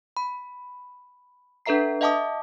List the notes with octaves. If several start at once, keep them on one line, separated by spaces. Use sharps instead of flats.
B5
D4 A4 B4 E5 A#5 C7
D#5 E5 F#5 A5 D6 D#6